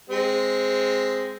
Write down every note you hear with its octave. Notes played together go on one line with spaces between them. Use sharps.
G#3 C4